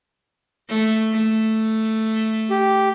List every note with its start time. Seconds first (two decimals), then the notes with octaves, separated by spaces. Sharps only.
0.69 A3
1.11 A3
2.50 G4